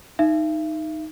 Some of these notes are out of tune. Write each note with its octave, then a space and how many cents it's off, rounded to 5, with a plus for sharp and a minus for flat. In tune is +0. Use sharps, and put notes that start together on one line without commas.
D#4 +0 E5 +40